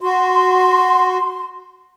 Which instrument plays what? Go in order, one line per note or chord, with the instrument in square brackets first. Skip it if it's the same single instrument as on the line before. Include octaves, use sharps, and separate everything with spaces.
[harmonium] F#4 [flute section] C6